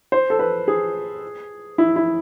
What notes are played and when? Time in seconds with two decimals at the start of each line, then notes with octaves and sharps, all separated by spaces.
0.12 C5
0.30 A4
0.39 B4
0.68 G#4
1.78 E4
1.96 E4